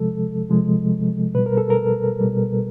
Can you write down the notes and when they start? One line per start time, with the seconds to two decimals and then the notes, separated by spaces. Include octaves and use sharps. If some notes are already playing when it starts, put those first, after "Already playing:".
Already playing: C3 F3 G#3 A4
0.50 C3 F3 G#3
1.35 B2 G3 B4
1.46 A#4
1.57 A4
1.70 A#4
2.21 B2 G3